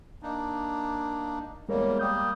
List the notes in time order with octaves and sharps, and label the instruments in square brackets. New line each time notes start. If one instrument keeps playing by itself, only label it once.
[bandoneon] A#3 D4 D#4
[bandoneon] E2 G3 A#3 [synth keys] G#3 A#4 C#5
[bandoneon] G3 A#3 [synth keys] G5 D#6 G6